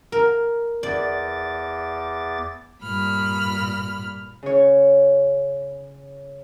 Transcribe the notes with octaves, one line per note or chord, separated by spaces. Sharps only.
A#4
E2 D5 D6 A6
G2 A#2 B5 F6
C#3 C#5